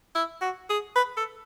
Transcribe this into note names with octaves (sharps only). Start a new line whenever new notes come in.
E4
F#4
G#4
B4
A4